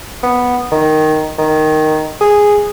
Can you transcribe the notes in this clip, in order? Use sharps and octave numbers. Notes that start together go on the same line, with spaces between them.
B3
D#3
D#3
G#4